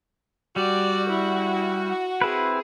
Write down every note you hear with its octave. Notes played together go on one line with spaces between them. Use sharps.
G3 F#4 D5
E4
C4 E4 G#4 B4